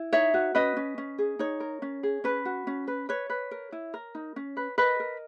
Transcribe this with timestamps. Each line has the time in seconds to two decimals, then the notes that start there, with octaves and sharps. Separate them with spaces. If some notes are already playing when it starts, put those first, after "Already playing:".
Already playing: E4
0.13 D#4 C#5 E5
0.34 F#4
0.55 C#4 B4 D#5
0.77 C#4
0.98 C#4
1.18 G#4
1.39 D#4 C#5
1.60 A#4
1.82 C#4
2.03 G#4
2.24 C#4 B4
2.45 F#4
2.67 C#4
2.87 B4
3.09 B4 C#5
3.30 B4
3.51 A#4
3.72 E4
3.94 A#4
4.15 D#4
4.36 C#4
4.57 B4
4.78 A#4 B4 D#5
5.00 A#4